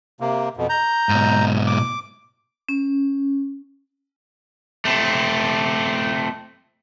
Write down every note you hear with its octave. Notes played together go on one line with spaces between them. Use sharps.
C3 A#3
F2 B2
A#5 G6
G#2 B2
D6
C#4
A3 C4